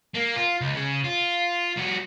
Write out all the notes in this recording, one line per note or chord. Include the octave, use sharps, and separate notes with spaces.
A#3
F4
C#2
C#3
F4
G3 F#4